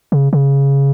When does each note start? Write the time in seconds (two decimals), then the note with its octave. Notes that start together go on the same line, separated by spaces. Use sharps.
0.12 C#3
0.33 C#3